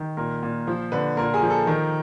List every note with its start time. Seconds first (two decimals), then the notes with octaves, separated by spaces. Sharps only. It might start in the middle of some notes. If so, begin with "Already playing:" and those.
Already playing: D#3
0.17 A#2 A#4
0.43 A#2
0.67 F3 C5
0.92 D3 B4
1.17 A#2 A#4
1.34 G#4
1.42 F3
1.50 A4
1.67 D#3 A#4